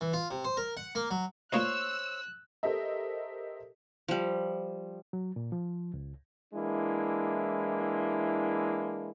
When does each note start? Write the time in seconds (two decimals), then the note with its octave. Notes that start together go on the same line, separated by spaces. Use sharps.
0.01 E3
0.13 F4
0.31 C3
0.44 C5
0.57 A#4
0.77 F#5
0.95 A#3
1.11 F#3
1.53 A#2 A#3 D#4 C5 C#5 E6 F#6
2.63 G4 A4 A#4 C5 D#5 E5
4.08 F3 G3
5.13 F#3
5.36 A#2
5.52 F3
5.94 C#2
6.53 E3 G#3 A#3 D4 E4